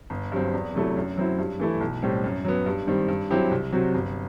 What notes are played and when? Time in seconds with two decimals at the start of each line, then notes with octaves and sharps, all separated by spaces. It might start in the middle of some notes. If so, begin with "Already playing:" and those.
0.10 G1
0.32 G2 F#3 C4
0.53 E2
0.74 C3 F#3 A3 E4
0.96 F#2
1.17 F#3 C4 E4
1.38 G2
1.60 E3 A3 E4
1.81 B1
2.02 A2 G3 C4
2.24 F#2
2.45 F#3 B3
2.66 G2
2.87 D#3 G3 C4
3.08 G2
3.31 F#3 C4 E4 G4
3.51 C2
3.72 C3 F#3 C4 F#4
3.94 G1